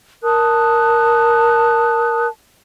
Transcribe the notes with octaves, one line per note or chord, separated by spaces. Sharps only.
A#4 A5 D#6 F#6